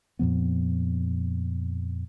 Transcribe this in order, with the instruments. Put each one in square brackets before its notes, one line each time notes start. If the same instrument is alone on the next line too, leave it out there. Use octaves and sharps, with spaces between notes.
[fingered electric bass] F2 A#2 F3 B3